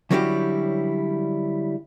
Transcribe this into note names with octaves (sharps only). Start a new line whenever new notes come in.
D3 F#3 G3 C#4 E4 G4